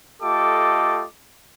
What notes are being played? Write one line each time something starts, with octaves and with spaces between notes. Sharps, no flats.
A3 F4 G4 A4 D#5 D6